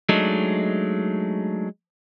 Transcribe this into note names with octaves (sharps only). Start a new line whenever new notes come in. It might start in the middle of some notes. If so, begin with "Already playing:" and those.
F#3 G#3 A3 D4 D#4